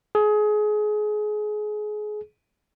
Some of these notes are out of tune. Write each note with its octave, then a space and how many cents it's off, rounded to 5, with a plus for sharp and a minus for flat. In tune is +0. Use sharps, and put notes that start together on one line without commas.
G#4 +25